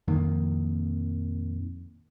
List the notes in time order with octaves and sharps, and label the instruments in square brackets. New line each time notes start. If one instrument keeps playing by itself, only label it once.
[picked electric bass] A#1 F2 D#3 A#3